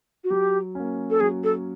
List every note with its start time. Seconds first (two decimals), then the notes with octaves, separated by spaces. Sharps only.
0.24 F#4
0.30 F#3 G4
0.75 A#3 C#4
1.10 A4
1.20 F#3 G#4
1.44 A4